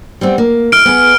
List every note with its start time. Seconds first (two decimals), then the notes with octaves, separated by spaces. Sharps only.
0.21 G3 B3 C4
0.38 A#3
0.72 E4 F6 D7
0.85 B3 G#4 B4